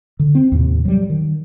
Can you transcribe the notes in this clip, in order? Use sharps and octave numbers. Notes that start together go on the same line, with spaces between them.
D3
C4
D#2 A2 C3
F#3 G3
D#3